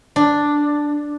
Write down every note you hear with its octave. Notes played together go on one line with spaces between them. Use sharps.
D4